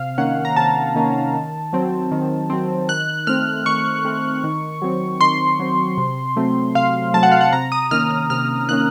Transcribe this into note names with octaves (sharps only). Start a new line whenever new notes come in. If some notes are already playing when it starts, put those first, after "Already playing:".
Already playing: C3 F5
D#3 A#3 C#4 F#5
A#5
C3 A5
D#3 A#3 C#4
D#3
F#3 C4
D#3
F#3 C4
D#3 F#6
A3 C4 F6
D#3 C#6
A3 C4
D#3
F#3 C4
D#3 C6
F#3 C4
C3
F#3 A3 C4
C3 F5
F#3 A3 C4 A5
F#5
F5
F#5
C3 A#5
D#6
D#3 A#3 C#4 F6
F6
C3 F6
D#3 A#3 C#4 F#6